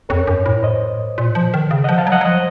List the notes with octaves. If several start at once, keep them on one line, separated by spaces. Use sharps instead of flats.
F2 A#4 C#5
F#2
A2
C5 D#5
A#2
F3
D#3
C#3
F3 D#5 F#5
F5 A5
F#3
D#5 F#5
F#3
F3 C5 D#5